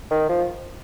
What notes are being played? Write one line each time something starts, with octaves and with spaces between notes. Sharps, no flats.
D#3
F3